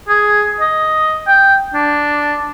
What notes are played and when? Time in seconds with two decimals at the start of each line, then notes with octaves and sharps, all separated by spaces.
0.08 G#4
0.60 D#5
1.27 G5
1.74 D4